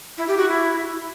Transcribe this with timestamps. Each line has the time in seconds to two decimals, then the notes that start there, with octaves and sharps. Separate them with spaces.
0.18 E4
0.28 G4
0.38 F#4
0.48 E4